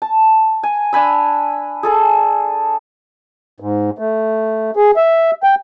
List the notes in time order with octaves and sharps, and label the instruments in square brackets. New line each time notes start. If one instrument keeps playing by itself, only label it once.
[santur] A5
G#5
D4 G#5 B5 E6
G#4 A4 G#5
[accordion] G#2
A3
G#4
E5
G5